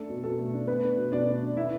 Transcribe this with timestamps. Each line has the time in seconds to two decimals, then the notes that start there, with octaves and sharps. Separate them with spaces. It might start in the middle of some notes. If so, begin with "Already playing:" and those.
Already playing: A3 D4 A4
0.09 B2
0.24 B2 A4
0.39 A3
0.54 D4
0.67 A3 B3 B4
0.83 D4
0.97 B2
1.12 B2 D4 D5
1.27 A3
1.42 D4
1.57 B3 E4 E5